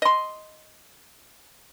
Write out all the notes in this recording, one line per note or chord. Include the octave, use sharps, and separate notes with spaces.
D#5 C6